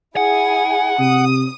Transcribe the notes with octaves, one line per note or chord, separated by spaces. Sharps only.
E4 G#4 F#5 G#5
C3 D#6